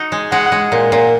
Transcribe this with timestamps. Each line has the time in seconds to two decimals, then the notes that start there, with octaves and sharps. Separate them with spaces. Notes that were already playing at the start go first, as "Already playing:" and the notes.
Already playing: D#4 F#4
0.12 G#3
0.32 G#3 F#5
0.52 G#3
0.72 A#2
0.92 A#2